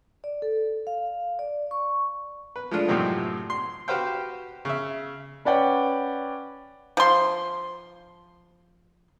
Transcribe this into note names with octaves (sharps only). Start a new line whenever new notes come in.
D5
A4
F5
D5
C#6
B4
F3 G#3 A3 D4 F4
F#2 A2 C3 F3 C4 D#4
C6
F#4 G4 B4 C5 F5 G5
C#3 E5
C#4 B4 D5 F#5 G5
F3 C6